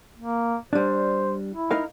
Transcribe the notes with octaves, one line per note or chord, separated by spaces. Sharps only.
A#3
G3 D4 C5
E4
D#4 A#4 F5